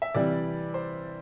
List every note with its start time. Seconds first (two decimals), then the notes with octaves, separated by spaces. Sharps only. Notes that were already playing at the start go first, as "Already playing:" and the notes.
0.02 E5
0.14 C3 E3 G3 D5
0.74 C5